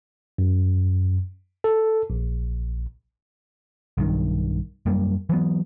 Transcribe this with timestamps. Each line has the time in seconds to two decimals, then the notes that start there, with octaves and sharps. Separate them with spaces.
0.38 F#2
1.64 A4
2.10 A#1
3.98 B1 G2 D#3
4.86 F#2 G3 A#3
5.29 E3 F#3 B3